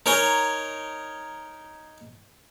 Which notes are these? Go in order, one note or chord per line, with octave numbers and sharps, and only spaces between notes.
D#4 A#4 C#5 D#5 G#5